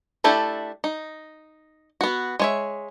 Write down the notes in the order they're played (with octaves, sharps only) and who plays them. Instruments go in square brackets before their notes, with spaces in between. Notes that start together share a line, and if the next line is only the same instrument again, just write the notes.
[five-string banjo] A3 D4 E4 G4 A4
D#4
B3 F#4
G#3 C#5 E5